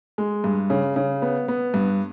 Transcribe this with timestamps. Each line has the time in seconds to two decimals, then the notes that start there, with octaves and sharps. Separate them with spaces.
0.18 G#3
0.44 G2
0.70 C#3
0.96 C#3
1.22 B3
1.48 B3
1.74 G2